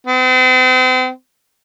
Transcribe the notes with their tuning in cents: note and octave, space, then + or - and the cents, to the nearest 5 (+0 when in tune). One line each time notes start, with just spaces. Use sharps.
C4 -40